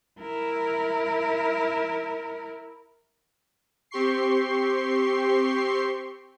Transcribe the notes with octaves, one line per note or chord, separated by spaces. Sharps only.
E4 A#4
C4 G4 C6 C#6 C7